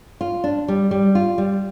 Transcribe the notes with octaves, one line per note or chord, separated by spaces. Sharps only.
F4
D4
G3
G3
F4
G3